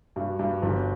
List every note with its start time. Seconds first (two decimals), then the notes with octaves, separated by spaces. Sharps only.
0.16 G2 F#4
0.39 G2
0.62 G1